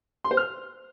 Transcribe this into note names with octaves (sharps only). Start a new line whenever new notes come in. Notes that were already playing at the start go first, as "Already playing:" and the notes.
C6
C5
F6